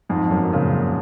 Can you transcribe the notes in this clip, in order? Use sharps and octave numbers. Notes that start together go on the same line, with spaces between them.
F2 G#2
F#2
A#2 C#3